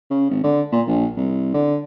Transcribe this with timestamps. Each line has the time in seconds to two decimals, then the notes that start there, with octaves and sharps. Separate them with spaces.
0.10 C#3
0.30 G#1
0.43 D3
0.72 A#2
0.87 A#1
1.17 C2
1.54 D3